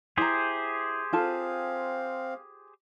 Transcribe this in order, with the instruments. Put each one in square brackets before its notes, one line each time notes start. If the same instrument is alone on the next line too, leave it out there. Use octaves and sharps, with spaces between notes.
[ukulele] E4 A#5 [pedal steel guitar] G4 G#4 C5
[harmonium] C4 F5 [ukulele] F4 A4 A5